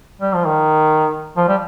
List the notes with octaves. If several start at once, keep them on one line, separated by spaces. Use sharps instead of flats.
G3
F3
D#3
F3
G3